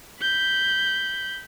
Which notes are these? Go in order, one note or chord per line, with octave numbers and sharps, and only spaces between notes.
B5 G6